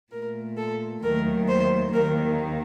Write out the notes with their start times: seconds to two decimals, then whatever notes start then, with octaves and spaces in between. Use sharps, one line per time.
0.12 A#2 A3 A#4
0.57 A4
1.03 D#2 D#3 F#3 A3 A#4
1.48 C5
1.93 D#2 D#3 A#3 A#4